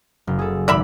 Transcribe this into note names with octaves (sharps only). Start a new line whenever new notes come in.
F#1
G#4 A4
G#1 D5 E5 B5